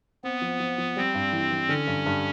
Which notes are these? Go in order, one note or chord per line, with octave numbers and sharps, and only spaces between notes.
B3 C4
F3
F3
F3
G3 C4
G2
E3
E3
D3 C#4
G2
G2